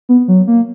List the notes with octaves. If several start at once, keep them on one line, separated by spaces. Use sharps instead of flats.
B3
F#3
A#3